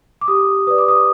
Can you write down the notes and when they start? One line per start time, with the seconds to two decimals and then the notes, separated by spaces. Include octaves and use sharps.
0.21 D6
0.28 G4 D#6
0.67 B4 D5 D#6
0.78 D6
0.88 D#6